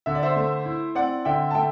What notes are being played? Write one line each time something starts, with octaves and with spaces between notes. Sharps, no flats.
D3 E5
D5
C5 E5
A3
E4
C4 D5 F#5
D3 E5 G5
A5
A3 E5 G5